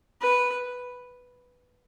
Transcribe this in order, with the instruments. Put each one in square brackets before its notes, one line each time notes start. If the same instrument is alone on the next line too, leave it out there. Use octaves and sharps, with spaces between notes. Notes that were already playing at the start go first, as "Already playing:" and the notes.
[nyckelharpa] B4